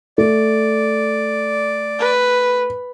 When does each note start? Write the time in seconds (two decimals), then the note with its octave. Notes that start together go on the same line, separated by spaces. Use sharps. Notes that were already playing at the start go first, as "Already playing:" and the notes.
0.18 A3 D5
2.00 B4